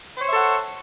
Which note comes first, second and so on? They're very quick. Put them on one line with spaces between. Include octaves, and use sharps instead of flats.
C5 C#5 E5 A4 F#5